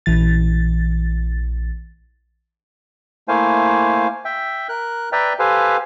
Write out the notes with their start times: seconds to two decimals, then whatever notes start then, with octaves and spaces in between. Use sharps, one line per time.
0.06 A#1 E3 A6
3.28 A3 A#3 E4 C5 F5 G#5
4.25 E5 G5
4.69 A#4 F#6
5.12 B4 D5 E5 G5 A#5
5.39 G4 A4 B4 C5 F5 G#5